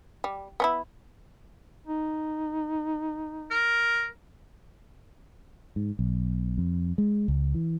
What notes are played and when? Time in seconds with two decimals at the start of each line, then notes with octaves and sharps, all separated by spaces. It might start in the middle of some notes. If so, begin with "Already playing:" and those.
0.24 G3
0.60 B3 C#4 E4
1.87 D#4
3.51 A#4
5.76 G#2
5.99 B1
6.58 F2
6.98 G#3
7.28 C#2
7.55 E3